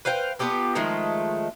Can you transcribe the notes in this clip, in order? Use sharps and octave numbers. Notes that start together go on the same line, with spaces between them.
B4 C5 F5 G5
B3 F4 G4 A4
D#3 F3 G#3 A3